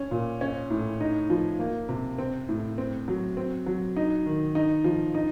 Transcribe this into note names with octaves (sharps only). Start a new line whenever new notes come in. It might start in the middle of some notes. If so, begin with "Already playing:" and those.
Already playing: C#4
A#2
C#4
A2
D#4
F3
A#3
C3
C4
A2
C4
F#3
C4
F#3
D#4
D#3
D#4
F3
D#4